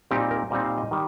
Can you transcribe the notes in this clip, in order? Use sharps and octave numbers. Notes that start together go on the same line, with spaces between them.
A#2 G3 C4 D#4 G4
A#4
A#2 G3 C4 D#4 D#5
F5
D#5
D#3 G3